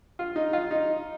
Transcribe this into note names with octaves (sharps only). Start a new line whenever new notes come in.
F4
D#4
F4
D#4